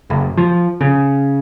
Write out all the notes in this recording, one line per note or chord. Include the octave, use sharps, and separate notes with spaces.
F#1
F3
C#3